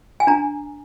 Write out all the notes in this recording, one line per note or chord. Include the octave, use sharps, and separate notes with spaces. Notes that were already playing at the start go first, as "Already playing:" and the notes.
G#5
D4 A#5